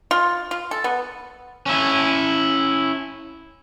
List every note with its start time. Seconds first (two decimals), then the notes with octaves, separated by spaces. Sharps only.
0.11 F4
0.51 F4
0.71 A4
0.84 B3
1.66 C#4 E4